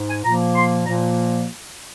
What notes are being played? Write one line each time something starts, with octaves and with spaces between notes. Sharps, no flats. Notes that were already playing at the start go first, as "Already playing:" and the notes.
Already playing: G#2
G#5
A#2 F3 A#3 A#5
C6
A#2 F3 A#3 A#5